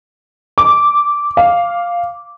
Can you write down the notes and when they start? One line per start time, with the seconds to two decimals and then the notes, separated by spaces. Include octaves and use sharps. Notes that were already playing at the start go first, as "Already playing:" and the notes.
0.58 D6
1.37 F5